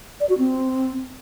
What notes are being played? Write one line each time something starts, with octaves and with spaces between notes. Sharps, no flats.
D5
F#4
C4